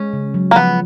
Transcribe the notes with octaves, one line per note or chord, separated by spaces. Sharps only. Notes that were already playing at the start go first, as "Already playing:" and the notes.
Already playing: G#3 C#4
C#3
F#3
A#3
F3 B3